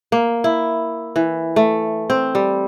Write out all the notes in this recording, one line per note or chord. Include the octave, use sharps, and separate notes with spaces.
A#3
E4
E3
A3
C4
G3